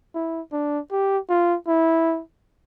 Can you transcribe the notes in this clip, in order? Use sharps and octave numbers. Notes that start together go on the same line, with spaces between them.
E4
D4
G4
F4
E4